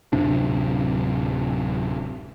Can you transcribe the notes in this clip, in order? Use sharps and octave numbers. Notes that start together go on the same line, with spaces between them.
D1 F#2 C3 D4